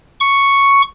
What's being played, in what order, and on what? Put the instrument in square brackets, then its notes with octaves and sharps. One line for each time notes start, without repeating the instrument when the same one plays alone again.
[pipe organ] C#6